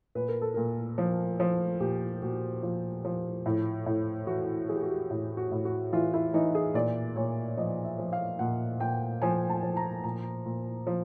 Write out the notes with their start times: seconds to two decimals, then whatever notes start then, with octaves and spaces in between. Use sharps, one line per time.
0.15 A#2 B4
0.28 A#4
0.41 A4
0.54 A#2 A#4
0.98 F3
1.40 F3
1.80 A#2 G4
2.22 A#2 F#4
2.62 F3 F4
3.05 F3
3.46 A2
3.86 A2
4.27 E3 F#4
4.69 E3 G#4
4.75 G4
4.83 F#4
4.90 G4
5.11 A2
5.37 F#4
5.52 A2
5.65 F#4
5.93 E3 F4
6.14 E4
6.34 E3 D#4
6.55 G#4
6.74 A#2 D5
7.16 A#2 C#5
7.57 F3 D#5
7.84 E5
7.99 F3
8.13 F5
8.39 A#2 F#5
8.80 A#2 G5
9.22 F3 G#5
9.50 A5
9.63 F3
9.77 A#5
10.04 A#2 A#5
10.46 A#2
10.87 F3